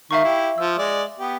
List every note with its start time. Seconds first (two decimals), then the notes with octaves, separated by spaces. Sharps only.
0.11 D#3 E5 F5 C#6
0.24 E4 G4
0.58 F3 E6
0.78 G#3 D5
1.19 B3 G4